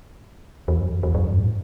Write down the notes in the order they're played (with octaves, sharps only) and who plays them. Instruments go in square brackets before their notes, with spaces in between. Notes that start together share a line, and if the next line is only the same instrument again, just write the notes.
[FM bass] E2
F#2
E2
E2
F#2
G2
A2